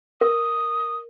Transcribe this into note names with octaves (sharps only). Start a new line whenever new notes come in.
A#4 D#6